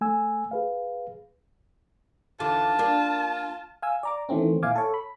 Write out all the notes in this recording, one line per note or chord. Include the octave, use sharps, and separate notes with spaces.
A3 G#5 E6
G#4 B4 F5
D#2 D3 E3 F4 A5
A#3 D4
F5 G#5 E6
D5 A#5 D6
D#3 E3 A3 C4 C#4
A#2 E4 F5 G#5 D6
A4 C#5
B5